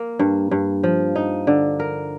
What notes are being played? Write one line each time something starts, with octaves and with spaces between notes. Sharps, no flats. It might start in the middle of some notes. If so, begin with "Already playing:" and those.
Already playing: A#3
G2
G2
F3
D#4
D3
A#4